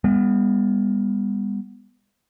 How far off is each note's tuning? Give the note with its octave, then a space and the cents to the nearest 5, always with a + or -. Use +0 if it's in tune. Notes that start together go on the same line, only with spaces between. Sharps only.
G3 +45 B3 -5